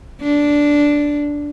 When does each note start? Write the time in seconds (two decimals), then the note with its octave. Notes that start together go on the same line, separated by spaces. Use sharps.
0.21 D4